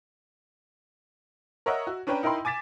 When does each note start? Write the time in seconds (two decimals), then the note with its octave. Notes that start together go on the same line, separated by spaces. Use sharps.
1.66 A#4 C#5 D#5 E5 F#5 A#5
1.87 F#4
2.07 C#4 D4 B4 C#5 G5 A#5
2.23 D#4 E4 A#4 G5 B5 C6
2.45 G#5 D6 A6 B6 E7